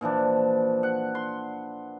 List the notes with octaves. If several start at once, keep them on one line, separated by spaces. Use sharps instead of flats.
A#2 E3 F3 D4
F#5
C6